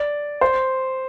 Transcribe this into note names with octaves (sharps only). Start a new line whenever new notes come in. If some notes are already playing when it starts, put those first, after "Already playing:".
Already playing: D5
C5